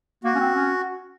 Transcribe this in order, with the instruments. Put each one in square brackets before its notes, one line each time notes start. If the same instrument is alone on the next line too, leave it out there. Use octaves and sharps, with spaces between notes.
[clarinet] A#3 [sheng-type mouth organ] F#4
[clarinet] C#4
C4
C#4